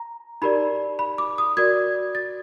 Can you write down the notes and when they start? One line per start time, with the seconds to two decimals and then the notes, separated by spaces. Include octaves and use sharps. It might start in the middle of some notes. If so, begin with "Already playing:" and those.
Already playing: A#5
0.42 D#4 G4 A#4 D5 B5
0.99 B5
1.18 D6
1.38 D#6
1.57 F#4 A#4 D5 G#6
2.15 A6